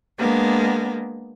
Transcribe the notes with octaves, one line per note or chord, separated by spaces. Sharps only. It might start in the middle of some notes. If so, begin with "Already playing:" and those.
G#3 A#3 B3 D4